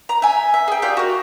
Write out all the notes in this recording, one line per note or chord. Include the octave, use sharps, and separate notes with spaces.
A#5
E5 G#5
E5
G#4 G5
F4 G4 D5 G6
F#4 A#4